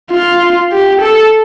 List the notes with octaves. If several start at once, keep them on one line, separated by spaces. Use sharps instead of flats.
F4
G4
A4